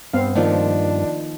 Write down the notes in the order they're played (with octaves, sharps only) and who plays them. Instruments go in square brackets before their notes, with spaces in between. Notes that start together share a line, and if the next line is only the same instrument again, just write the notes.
[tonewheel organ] G2 [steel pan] B3 C4 F5
[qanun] D#3 F3 F4 [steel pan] A#3 [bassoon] D4